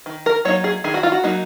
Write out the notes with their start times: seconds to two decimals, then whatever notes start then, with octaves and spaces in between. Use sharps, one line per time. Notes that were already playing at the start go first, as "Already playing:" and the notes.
0.06 D#3
0.26 A#4
0.45 F#3 A#3 D#4 C#5
0.64 G#4
0.84 D#3 G#4
0.94 F#4
1.03 F4
1.12 F#4
1.24 F#3 A#3 D#4